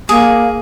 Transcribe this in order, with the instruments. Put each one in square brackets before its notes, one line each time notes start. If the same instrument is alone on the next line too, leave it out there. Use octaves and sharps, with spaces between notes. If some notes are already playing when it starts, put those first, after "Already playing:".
[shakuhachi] A#3 [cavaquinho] G#4